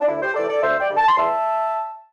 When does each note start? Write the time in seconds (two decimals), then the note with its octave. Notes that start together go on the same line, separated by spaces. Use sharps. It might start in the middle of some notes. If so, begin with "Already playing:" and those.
0.01 D4
0.07 D2 E4
0.21 G4 C5
0.34 C3 E3 A3 A4 D5
0.48 A4 D5
0.62 D2 C5 E5
0.79 D5 G5
0.89 D3 G3
0.97 A5
1.07 C6
1.15 E2 E5 A5